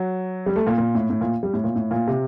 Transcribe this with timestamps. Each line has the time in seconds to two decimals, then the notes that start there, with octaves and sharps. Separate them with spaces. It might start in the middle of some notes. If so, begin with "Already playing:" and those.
Already playing: F#3
0.46 G3
0.56 A3
0.67 A#2
0.78 A#2
0.95 A2
1.10 A2
1.21 A#2
1.43 G3
1.53 A2
1.64 A#2
1.76 A2
1.91 A#2
2.07 C3